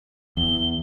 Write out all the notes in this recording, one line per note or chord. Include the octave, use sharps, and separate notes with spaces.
E2 G7